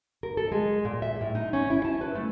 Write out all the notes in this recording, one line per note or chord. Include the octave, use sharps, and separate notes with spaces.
A#4
A4
G#3
A#2
E5
A2
D#4
C#4
E4
A5
B4
A3